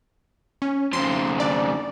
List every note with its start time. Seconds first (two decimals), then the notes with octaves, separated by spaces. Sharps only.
0.62 C#4
0.93 F2 C#3 C6
1.40 D4 D5